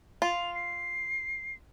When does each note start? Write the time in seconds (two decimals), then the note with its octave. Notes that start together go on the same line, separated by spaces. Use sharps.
0.22 F4 F7
0.55 C7